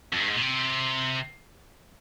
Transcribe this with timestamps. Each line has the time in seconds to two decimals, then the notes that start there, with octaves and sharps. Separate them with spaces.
0.13 F2
0.20 G2
0.28 G#2
0.34 A#2
0.42 C3